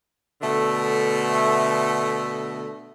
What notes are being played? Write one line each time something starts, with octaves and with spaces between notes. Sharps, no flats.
B2 D3 A3